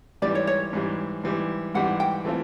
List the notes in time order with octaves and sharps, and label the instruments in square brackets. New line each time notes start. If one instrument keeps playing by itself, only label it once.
[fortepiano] G#2 E3 G3 [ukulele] D5
[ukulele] C#5
C#5
[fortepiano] G#2 E3 G3
G#2 E3 G3
[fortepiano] G#2 E3 G3 [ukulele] F#5
[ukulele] G5
[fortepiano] E3 A3 C4 F4